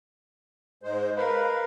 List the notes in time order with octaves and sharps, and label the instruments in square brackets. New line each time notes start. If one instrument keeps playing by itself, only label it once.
[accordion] G#2 G#3 C5
[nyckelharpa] A#4 [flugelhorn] B4 [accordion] F5